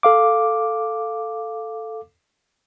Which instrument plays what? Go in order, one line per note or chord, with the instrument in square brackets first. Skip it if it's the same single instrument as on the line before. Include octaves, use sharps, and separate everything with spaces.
[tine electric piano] A4 F5 D6